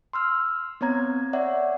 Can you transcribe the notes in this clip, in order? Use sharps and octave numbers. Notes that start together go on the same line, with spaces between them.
C6 E6 F6
B3 C4 C#5 A#5 G#6
C#5 D5 E5 F#5